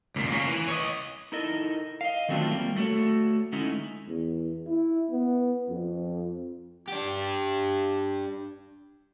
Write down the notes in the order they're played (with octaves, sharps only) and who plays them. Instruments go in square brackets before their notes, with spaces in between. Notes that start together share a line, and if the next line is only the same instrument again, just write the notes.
[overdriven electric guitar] C#2 A#2
A#3 C#4
E3
C#5 D#5
[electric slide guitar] D#4 E4 A4 A#4 D#5
D#5 F5
D#3 F#3 A3 C4 D4 F4
G3 A#3
A3 F#4 A4 C#5
D3 G#3 A3 C#4 D#4 E4
[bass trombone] E2
E4
B3
F2
[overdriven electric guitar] D4 G4